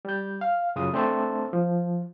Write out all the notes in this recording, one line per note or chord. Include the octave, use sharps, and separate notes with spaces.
G3 G6
F5
F#2 C#3 F4 D#6
A3 C4 D4 C5 E5 A5
F3